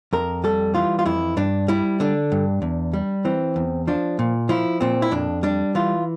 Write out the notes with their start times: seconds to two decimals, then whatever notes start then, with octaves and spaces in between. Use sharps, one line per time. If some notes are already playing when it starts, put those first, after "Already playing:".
0.13 F2 A#4
0.44 G3 A4
0.75 E3 F4
0.99 F4
1.05 F2 E4
1.37 G2 D4
1.68 G3 E4
2.00 D3 D4
2.32 G2
2.62 E2
2.93 G3
3.25 E3 C4
3.56 E2
3.87 F3 D4
4.19 A#2
4.49 F3 E4
4.81 A#2 C4
5.02 E4
5.11 F2 D4
5.43 G3 D4
5.75 E3 F4